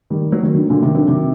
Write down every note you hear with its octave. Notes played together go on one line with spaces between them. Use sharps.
D#3 G3
F#3
D#3
D3 F#3
A#2 D3
C3 D#3
D3 F#3
C3 D#3